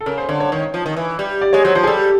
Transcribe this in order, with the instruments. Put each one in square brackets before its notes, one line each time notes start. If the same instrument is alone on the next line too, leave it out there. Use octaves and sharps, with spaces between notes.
[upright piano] A4
[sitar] C#3 [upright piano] A#4
[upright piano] C5
[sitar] D3 [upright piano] C#5
[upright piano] C#5
[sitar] D#3 [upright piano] C#5
[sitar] F3
D#3
E3
G3
[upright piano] D5
[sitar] G#3 [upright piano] C#5
[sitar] F#3 [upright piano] C5
[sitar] F3 [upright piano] C5
[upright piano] G#4
[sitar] G3 [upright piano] A4